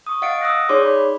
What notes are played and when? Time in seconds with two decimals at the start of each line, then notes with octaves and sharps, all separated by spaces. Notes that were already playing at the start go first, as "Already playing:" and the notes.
0.07 C#6 D#6
0.22 D#5 F5 F#5 A6 C#7 D7
0.41 D#6 E6 F#6 A#6
0.69 D#4 G#4 C#5 D5 C6 D6
0.85 B5